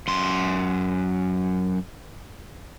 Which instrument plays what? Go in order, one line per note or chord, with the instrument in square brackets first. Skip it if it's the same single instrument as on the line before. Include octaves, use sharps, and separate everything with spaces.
[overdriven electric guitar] F#2 C6